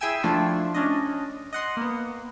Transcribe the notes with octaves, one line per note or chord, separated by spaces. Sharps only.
E4 G#4 E5 G5 G#5 E6
F3 A3 D4 E4 F4
C#4 D4 D#5
D#5 F#5 C6
A#3 B3